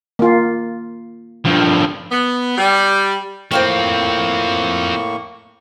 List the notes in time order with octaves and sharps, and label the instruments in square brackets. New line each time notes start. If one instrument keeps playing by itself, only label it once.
[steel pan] A#3 F4
[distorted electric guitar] G2 F3
[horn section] B3
G3
[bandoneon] A2 A#3 C#6 [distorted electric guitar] F3 C4 [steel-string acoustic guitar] C5 F5 G5